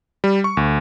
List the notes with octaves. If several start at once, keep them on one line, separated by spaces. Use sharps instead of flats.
G3
C#6
D2